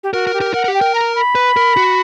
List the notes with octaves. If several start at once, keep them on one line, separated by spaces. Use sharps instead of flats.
G4
F#4 A#4
A#4
G4
A#4
A#4 F#5
A#4
G4
G5
A#4
A#5
B5
B4
A#4
F#4